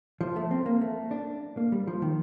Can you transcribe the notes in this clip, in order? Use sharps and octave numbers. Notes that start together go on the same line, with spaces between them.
F3
A3
C4
A#3
A3
D4
A#3
G3
F3
D#3